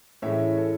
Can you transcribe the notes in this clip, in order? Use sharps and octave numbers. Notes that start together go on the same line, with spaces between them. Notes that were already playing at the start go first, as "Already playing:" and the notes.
A2 E3 G#3 C#4 C#5 E5
A4